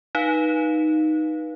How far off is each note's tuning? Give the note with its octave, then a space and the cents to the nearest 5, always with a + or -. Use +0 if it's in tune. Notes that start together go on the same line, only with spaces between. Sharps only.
D#4 +0 B4 -20 F5 +0